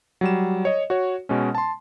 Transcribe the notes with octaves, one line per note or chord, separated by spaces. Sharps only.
F#3 G3 E7
C#5 D#5
F#4 C#5
B2 G#3 C#4
A5 C6